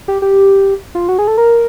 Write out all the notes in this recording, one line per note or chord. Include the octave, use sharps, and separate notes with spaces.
G4
G4
F4
F#4
G#4
A4
A#4